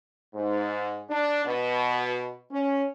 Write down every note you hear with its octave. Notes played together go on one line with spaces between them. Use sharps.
G#2
D4
B2
C#4